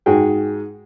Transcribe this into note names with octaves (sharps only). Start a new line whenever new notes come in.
G#2 F#4 G#4 G5